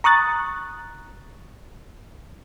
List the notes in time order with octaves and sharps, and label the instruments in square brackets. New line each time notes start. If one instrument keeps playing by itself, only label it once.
[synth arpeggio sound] A#5 C#6 D#6 F#6 A6